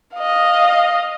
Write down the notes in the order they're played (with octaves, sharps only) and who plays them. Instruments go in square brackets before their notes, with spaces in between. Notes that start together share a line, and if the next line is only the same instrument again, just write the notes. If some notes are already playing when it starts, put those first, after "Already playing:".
[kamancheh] D#5 F5